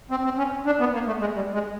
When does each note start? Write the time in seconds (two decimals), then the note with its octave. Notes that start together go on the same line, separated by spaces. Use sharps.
0.11 C4
0.24 C4
0.38 C#4
0.66 D4
0.80 B3
0.94 A#3
1.07 A3
1.20 G#3
1.35 G3
1.53 G#3